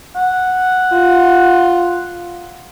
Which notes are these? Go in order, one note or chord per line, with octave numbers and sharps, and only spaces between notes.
F#5
F4